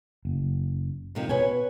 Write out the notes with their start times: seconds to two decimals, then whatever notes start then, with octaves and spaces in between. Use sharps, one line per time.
0.25 F#1
1.15 F2 C3 D#3
1.29 B2 B4 C#5 G#5